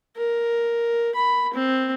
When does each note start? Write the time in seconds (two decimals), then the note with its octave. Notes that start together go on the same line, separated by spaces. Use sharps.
0.17 A#4
1.15 B5
1.54 C4